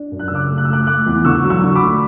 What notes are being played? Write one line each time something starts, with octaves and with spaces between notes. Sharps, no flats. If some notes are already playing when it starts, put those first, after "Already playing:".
Already playing: D4
F#2
F#6
E6
C#3 D6 F#6
A3
F#6
E6
A3 D6 F#6
A3 D6 F#6
E2
D3 C#6 E6
F#3
C#6 E6
D3
B5 D6
A3